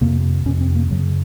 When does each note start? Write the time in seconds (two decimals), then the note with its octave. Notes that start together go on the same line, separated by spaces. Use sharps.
0.01 F2 C3 A#3
0.45 F2 C3 C#4
0.61 C4
0.76 A#3
0.90 F#2 C#3 F#3